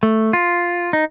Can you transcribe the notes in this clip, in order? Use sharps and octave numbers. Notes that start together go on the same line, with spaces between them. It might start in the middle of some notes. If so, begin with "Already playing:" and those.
A3
F4
D#4